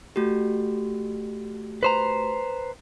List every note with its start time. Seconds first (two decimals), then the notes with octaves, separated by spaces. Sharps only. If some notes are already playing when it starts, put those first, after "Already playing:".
0.16 A3 F#4 G4
1.83 B4 C5 A#5